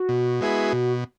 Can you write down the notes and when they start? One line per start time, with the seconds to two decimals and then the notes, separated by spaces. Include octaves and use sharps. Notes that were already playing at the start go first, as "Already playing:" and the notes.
Already playing: F#4
0.09 B2
0.41 G#3 B3 E4 G#4
0.73 B2